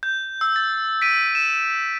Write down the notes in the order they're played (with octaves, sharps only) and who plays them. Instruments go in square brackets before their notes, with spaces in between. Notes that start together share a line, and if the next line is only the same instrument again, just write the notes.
[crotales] G6
E6
A6
B6 D7 D#7
E7